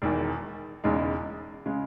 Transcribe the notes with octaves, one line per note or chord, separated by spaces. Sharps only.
E1 E2 D#3
E1 E2 C#3 G#3 D#4
C#3 G#3